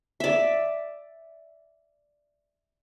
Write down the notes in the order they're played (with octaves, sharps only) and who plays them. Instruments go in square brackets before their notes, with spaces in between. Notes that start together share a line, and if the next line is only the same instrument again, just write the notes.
[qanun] D5 E5